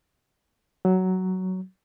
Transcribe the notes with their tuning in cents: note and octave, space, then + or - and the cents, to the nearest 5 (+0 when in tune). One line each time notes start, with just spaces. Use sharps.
F#3 +10